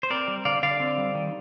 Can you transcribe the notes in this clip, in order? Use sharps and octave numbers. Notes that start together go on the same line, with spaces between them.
C5
C4 A#4 D5
G3
D3 D5 F5
D3 D5 F5
C4
G3
D#3